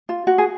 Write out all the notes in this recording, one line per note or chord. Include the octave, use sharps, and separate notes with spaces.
F4
F#4
G#4